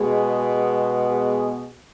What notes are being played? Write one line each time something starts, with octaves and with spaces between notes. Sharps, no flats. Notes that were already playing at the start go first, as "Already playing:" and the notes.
Already playing: B2 G#3 B3 G#4
G#4